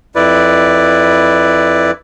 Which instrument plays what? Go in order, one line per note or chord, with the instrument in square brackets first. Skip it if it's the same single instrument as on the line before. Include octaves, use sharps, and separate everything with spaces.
[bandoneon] F2 E4 B4 D5